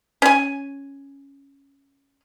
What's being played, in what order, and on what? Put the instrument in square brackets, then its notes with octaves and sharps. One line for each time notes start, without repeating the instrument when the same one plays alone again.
[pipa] C#4 G#5